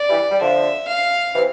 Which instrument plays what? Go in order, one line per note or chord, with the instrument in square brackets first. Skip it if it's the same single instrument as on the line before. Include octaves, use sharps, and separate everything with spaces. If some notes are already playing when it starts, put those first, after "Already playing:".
Already playing: [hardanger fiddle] D5
[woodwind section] E3 G3
G3
[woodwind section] D3 F3 [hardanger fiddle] E5
[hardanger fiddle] F5
[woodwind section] C3 E3